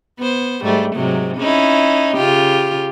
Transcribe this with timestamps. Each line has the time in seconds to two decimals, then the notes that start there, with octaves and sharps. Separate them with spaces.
0.19 B3 C5
0.63 G#2 G3 A3
0.96 G#2 C3 F#3
1.37 C#4 D#4 E4
2.16 C#3 F4 G4